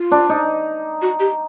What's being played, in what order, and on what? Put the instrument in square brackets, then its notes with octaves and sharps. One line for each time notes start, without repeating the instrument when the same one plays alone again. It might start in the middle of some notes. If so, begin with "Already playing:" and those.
Already playing: [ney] F4
[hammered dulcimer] D4
D#4
[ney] F#4
G4